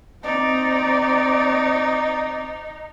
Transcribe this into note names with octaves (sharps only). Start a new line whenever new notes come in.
C4 D#4 D5